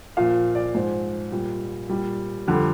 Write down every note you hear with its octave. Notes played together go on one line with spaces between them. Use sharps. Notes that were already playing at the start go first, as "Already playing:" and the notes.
A#2 F3 F5
D5
G#2 F3 C5
A#2 G3
A#2 G3
F2 D3 G3